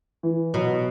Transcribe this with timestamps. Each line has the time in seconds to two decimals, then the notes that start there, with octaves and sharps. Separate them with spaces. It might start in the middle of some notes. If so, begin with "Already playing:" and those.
0.23 E3
0.54 B2 F#3